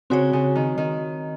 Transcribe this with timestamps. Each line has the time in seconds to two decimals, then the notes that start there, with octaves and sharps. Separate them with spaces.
0.10 C#3 C4 F#4 C#5
0.33 C#3
0.55 D#3
0.78 D#3